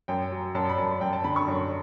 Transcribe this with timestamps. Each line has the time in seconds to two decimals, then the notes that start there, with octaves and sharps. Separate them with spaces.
0.08 F#2 G5
0.31 F#3
0.55 F#2 A5
0.69 B5
0.78 F#2 A5
1.01 F#2 G5
1.13 A5
1.24 D3 B5
1.36 C#6
1.48 F#2